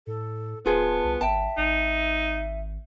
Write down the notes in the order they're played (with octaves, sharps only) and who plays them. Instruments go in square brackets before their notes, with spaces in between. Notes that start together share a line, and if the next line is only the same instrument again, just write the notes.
[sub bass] A2 [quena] A4
[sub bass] D1 [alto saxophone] B3 [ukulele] F4 G#4 C5 [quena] A5
[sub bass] C2
[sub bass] G#1 [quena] E5 [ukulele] G5 A5
[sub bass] G#1 [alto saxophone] D#4